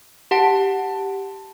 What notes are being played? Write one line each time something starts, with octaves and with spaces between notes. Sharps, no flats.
G4 F#5 A5